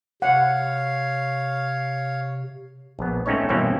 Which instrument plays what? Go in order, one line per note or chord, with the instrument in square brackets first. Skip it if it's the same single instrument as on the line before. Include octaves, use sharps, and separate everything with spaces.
[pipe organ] C3 [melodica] C#5 F5 [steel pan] F#5
[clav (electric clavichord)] A#1 B3
A3 C4 C#4 D#4 C#5
G2 B2 E3 A#3 C4 C#4